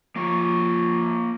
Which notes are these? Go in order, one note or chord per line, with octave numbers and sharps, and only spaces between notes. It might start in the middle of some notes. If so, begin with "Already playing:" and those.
F3 A#3 C#5